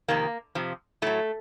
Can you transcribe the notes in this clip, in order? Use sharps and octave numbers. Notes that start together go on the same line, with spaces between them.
F2 C3 D#3 A#3
F2 C3 F3
A2 F#3 A3